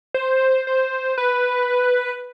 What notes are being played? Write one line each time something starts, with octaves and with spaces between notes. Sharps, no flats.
C5
C5
B4